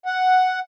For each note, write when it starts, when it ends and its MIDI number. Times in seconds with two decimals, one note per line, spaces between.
0.06 0.60 78